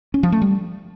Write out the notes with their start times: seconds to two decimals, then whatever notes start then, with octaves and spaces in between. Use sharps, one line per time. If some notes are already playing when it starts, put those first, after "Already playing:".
0.14 C#4
0.23 F3
0.32 A3
0.42 G3